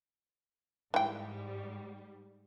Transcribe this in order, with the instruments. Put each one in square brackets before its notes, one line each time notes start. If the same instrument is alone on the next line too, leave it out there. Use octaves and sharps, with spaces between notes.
[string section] G#2 G3 [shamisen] E3 G5